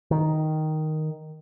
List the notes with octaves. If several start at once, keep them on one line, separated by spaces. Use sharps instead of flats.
D#3